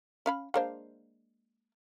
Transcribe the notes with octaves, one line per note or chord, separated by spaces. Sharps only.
C#4 F5 B5
G#3 A#3 D4 C5 F5